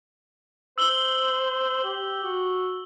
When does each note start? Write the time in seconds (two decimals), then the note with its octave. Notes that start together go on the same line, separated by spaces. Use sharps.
0.78 C5 E6 F#7 G7
1.84 G4
2.23 F#4